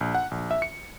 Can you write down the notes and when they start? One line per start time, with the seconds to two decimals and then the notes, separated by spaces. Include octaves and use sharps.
0.01 A#1
0.15 F#5
0.31 A#1
0.51 E5
0.62 C#7